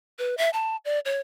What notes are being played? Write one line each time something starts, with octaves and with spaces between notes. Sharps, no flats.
B4
E5
A5
D5
C#5